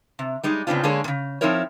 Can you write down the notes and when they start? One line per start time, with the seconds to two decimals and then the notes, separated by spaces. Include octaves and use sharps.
0.19 C3
0.43 G3 G#3 D#4
0.67 A2 C#3 B3 C4 D4 F4
0.84 D3 G#3 A#3 D4 G#4 C#5
1.04 A#2 C#3
1.41 F3 C4 D#4 E4 A#4 C#5